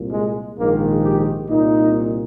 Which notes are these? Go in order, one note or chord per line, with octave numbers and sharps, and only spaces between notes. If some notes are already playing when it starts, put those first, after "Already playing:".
Already playing: C2 A#2
G#3
A#1 G#2 D#3 A#3
G4
C2 A#2 D#4